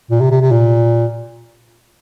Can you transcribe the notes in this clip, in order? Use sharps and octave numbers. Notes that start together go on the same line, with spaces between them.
A#2
C3
C3
C3
A#2